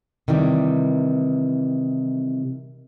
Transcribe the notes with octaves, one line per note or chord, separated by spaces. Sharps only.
C3 D#3 E3 G3